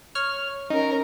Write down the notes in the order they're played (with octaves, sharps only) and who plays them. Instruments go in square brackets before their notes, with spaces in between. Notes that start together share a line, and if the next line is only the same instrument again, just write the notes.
[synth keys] C#5 F6
[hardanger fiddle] C#4 A#4 [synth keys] D#4